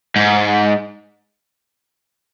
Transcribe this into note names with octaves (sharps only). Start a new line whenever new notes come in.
G#2